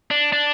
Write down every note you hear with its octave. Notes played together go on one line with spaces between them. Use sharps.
D4
D4